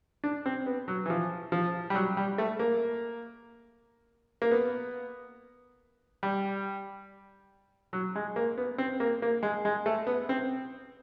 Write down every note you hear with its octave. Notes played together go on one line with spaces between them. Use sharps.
D4
C4
B3
F#3
E3
F3
F3
G3
F#3
G3
A3
A#3
A#3
B3
G3
F#3
G#3
A#3
B3
C4
A#3
A#3
G#3
G#3
A3
B3
C4